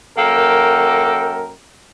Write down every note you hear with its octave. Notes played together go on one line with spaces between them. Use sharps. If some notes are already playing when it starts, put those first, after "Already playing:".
F#2 A#3 A4 A#4 G5